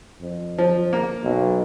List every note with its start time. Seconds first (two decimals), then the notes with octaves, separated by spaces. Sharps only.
0.22 F2
0.58 F3
0.93 A#3
1.23 B1